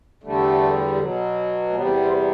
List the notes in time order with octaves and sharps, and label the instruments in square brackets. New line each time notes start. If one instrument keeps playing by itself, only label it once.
[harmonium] E2 D3 G3 A3
B2 F#3
A3
E2 C3 G3 B3
C4